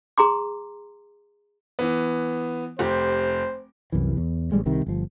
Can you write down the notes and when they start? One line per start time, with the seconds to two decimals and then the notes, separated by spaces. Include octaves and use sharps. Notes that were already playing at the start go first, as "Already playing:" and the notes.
0.18 G#4 A#5 C6 D6
1.79 E3 B3
2.79 F1 G4 C5
3.92 C2 F#2 E3
4.17 E2
4.52 A1 G3 G#3
4.66 C2 C3 D#3 G3
4.86 G1 F3